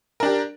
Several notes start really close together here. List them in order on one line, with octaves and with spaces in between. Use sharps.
A#4 D4 G4